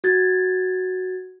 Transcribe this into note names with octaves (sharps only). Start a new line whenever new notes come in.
F#4 G#6 A6